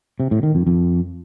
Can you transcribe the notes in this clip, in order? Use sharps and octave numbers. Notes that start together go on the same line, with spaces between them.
C3
A2
D#3
F2
F2